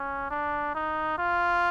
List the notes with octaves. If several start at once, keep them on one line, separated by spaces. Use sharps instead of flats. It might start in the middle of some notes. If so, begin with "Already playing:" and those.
Already playing: C#4
D4
D#4
F4